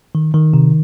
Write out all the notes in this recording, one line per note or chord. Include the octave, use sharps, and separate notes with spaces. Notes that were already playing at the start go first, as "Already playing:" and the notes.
D#3
D#3
C3